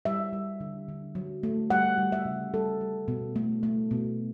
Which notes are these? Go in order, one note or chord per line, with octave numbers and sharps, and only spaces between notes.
G3 E5
G3
D3
D3
F#3
A3
G3 F#5
G3
E5
C#3
G3 A4
G3
B2
A3
A3
B2